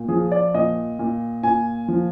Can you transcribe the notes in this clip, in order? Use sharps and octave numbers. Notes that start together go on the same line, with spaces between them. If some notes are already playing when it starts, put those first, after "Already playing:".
Already playing: A#2
F3 G#4
D5
A#2 D#5
A#2
A#2 G#5
F3